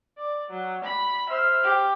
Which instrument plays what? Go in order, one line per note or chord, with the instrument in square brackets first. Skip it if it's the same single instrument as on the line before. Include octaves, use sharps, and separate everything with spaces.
[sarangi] D5
F#3
B5
[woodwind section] C5 C6 F6 [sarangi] E5
[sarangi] G4